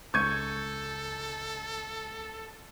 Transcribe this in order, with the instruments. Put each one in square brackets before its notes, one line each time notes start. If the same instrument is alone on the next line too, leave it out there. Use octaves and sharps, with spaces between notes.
[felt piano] C#2 D#7 [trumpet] A4 [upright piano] C#6 G#6 [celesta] G6